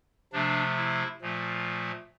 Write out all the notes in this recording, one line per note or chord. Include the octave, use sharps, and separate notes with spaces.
C3 F3 A3 D4
E4
A#2 F3 A3